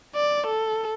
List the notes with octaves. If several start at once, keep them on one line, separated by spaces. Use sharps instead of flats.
D5
A4